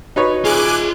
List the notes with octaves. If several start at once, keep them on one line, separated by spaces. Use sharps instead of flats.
D#4 F#4 B4 C#5
F4 G#4 E5 G#5 D6 F#6